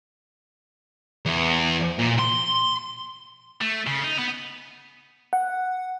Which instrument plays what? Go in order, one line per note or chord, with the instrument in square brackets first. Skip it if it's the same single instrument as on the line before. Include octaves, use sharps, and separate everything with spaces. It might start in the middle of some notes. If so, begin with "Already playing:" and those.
[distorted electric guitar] E2
A#2
C6
A3
C#3
D#4
B3
[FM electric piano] F#5